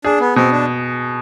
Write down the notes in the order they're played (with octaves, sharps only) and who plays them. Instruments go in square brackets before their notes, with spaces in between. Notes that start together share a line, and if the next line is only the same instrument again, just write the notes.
[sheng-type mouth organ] D4 [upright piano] G#4
[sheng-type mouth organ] B3
[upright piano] B2 [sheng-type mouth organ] C4
[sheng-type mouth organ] D4